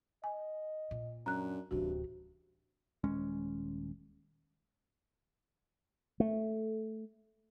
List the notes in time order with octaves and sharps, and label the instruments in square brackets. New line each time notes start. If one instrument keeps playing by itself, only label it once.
[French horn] D#5 [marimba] G#5
[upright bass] A#2
[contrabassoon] F#2 [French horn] D4 [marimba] A#5 F#6
[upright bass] D1 E3 [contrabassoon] G2 [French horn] C3 [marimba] F#4
[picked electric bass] D#1 G#3 C#4
[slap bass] A3